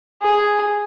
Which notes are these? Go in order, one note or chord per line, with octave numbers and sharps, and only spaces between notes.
G#4